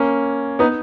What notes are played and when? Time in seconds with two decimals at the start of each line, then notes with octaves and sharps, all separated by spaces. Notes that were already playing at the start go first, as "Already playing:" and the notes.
Already playing: A#3 C#4
0.59 B3 D#4